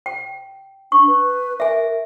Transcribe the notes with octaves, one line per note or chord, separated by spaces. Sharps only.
G5
D4 C#6
B4
A#4 E5 G#5